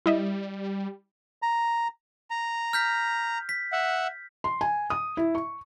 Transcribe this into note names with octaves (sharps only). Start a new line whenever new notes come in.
G3 E4 D#5 E5
A#5
A#5
F6 G6 B6
B6
E5 F#5
C6
G#5
D#6
E4
C#6